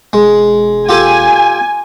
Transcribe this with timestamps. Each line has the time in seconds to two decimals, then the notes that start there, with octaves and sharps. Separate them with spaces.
0.13 E1 G#3
0.89 F4 G4 A4 G#5